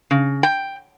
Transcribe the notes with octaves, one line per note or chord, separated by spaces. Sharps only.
C#3
G5